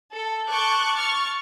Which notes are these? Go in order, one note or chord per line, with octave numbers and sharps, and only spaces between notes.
A4
A5 C#6 D6 F#6 G6
C#6 F6 A6